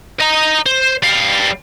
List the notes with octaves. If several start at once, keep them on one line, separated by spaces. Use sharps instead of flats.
D#5 A#5
C5
G3 F5